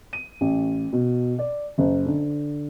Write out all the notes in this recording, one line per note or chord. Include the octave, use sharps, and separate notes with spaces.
D#7
A1
B2
D5
F#1
D3